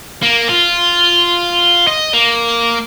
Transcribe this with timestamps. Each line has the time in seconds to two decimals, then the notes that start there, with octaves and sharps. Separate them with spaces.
0.22 A#3
0.49 F4
1.87 D#5
2.13 A#3